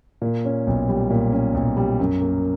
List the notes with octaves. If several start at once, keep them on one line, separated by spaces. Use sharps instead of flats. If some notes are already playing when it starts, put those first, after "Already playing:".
A#2
C#4
B1
G3
A#2
C#4
B1
G3
F#2
A#3